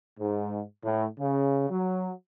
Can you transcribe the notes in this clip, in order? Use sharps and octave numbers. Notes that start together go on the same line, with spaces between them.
G#2
A2
C#3
F#3